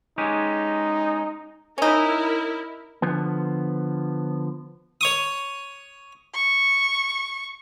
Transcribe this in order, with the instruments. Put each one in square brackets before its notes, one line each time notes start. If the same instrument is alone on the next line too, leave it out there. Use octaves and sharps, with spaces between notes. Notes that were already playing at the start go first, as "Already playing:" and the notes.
[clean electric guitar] G#3 C#4 G4 [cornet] D#4
[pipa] C#4 D#4 [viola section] E4 A#4
[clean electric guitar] D3 F3 B3
[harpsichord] C#5 C#6 D#6
[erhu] C#6